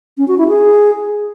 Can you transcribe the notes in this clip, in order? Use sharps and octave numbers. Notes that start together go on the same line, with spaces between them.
C#4
F#4
E4
G#4